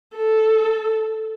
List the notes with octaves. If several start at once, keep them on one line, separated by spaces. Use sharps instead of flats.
A4